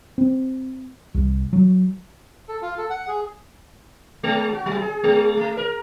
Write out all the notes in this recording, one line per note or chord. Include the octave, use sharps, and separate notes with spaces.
C4
C2
F#3
A4
F4
A4
F#5
G#4
G#3
F#4
F#3
G#4
G#3
A3
A#4